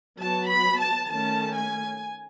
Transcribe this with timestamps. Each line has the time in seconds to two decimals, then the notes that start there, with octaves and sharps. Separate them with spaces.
0.21 F#3 B3 A5
0.51 B5
0.81 A5
1.11 D#3 A3 C#4 A5
1.57 G#5